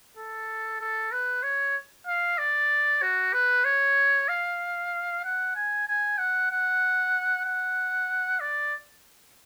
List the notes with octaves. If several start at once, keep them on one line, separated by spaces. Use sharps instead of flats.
A4
A4
B4
C#5
F5
D5
F#4
B4
C#5
F5
F#5
G#5
G#5
F#5
F#5
F#5
D5